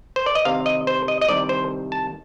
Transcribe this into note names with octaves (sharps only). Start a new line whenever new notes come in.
C5
D5
D#5
C2 C3 D#3 G3 F5
D#5
C5
D#5
D#5
C2 C3 D#3 G3 D5
C5
A5